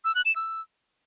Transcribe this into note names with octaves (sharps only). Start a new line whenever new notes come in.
E6
F#6
E7
E6